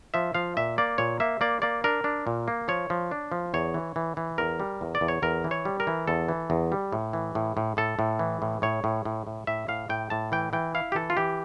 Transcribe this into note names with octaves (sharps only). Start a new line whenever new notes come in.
F3 E5
F3 F5
A#2 E5
A#3 D5
A#2 C#5
A#3 E5
A#3 D5
A#3 D5
D4 A#4
D4
A#2
A#3
F3 C#5
F3
D4
F3
E2 C#5
E3
E3
E3
E2 A#4
G3
E2
D5
E2
C#5
E2 A#4
E3
C#5
G3
A#4
E3
E2 A4
E3
E2
G3
A2
E3
A2
A2
A2 A4
A2
E3
A2
A2 C#5
A2
A2
A2
A2 E5
A2 F5
A2 G5
A2 A5
E3 G5
E3 G5
E4 F5
G4
E3 A4
F4
E3 G4